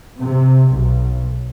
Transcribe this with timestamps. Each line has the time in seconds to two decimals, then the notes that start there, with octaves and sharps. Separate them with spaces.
0.18 C3
0.69 B1